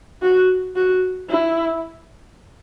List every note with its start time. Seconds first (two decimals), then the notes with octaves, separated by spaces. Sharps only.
0.22 F#4
0.76 F#4
1.30 E4